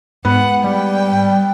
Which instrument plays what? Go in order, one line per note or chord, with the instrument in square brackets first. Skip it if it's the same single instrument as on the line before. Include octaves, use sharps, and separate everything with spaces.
[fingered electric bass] G#2 [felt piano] B3 [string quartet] F#5
[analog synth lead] G3 [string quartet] G5